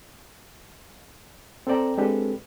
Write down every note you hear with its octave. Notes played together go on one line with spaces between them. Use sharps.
C4 A4 C5 D5 G5 A#5
G#3 C4 D4 G4 A4 B4